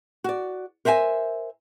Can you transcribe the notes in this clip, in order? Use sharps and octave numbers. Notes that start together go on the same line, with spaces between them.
F#4 D5
A#4 C5 E5 F#5 G#5